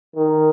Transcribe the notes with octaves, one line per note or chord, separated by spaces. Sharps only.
D#3